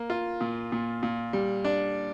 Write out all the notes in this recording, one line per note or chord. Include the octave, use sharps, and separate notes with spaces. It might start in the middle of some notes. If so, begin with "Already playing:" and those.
Already playing: A#3
F4
A#2
A#2
A#2
G3
D4